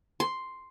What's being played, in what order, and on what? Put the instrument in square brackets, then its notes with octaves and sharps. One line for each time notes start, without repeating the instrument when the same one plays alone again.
[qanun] C6